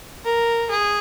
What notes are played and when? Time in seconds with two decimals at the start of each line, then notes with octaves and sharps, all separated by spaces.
0.24 A#4
0.70 G#4